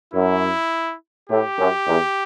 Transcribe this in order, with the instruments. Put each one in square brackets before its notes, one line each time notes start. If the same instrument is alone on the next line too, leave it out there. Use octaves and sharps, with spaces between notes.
[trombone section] F#2 [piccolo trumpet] E4
[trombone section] A2 [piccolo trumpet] G4
[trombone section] F#2
E2